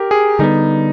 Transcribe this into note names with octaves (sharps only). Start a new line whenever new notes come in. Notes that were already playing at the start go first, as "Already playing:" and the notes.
Already playing: G4 A#4
G#4
D3 G3 B3 D#4